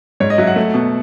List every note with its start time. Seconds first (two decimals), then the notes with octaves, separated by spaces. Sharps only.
0.20 G#2 C#5
0.30 D#5
0.38 F#3 E5
0.47 F#5
0.56 A3
0.74 B2